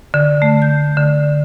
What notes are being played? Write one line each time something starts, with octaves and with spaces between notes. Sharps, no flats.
D3
A3
G6
D3